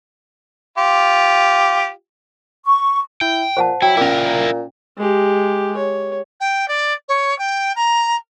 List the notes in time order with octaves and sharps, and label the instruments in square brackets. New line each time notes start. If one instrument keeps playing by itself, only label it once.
[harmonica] F4 G4
[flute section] C#6
[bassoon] E4 [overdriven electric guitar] G5
[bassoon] A#2 [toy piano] C5 F#5 A5
[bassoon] F#3 [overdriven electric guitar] E4 [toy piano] G5
[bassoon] A#2 [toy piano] C#4 F5 [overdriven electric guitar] E4 A#4
[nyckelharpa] G#3 G4
C#5
[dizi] G5
D5
C#5
G5
A#5